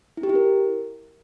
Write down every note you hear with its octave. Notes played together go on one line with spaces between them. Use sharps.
E4
G4
E4
A#4